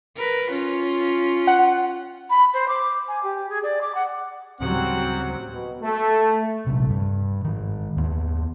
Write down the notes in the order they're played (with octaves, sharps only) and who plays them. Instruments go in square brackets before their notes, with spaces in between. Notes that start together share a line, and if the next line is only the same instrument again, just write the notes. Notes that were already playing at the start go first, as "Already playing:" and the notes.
[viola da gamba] A#4 B4
C#4 F4
[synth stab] F#5
[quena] B5
C5
D6
G#5
G4
G#4
D5
D6
F#5
[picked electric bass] D2 A2 C#3 [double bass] F#3 G3 [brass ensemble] C4 [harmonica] F#5
[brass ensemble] B2
A3
[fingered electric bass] A#1 C3
G2
G#2 D#3
D#2 B3